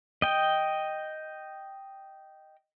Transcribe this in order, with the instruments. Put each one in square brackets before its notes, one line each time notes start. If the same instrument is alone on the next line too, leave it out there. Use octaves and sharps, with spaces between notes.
[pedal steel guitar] D#5 G5